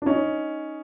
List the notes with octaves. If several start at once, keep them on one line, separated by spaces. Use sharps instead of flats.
D4
C#4 D#4